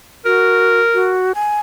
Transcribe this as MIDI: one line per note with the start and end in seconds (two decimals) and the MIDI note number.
0.25 0.79 66
0.25 1.16 70
0.94 1.32 66
1.35 1.60 80